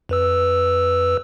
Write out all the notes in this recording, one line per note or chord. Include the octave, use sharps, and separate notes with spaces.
F2 B4 E6